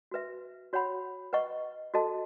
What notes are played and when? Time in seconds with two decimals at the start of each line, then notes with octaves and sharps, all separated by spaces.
0.11 F#4 B4 E5
0.73 F#4 C#5 F#5 B5
1.33 B4 D#5 F#5 C#6
1.94 F#4 A4 D#5 A5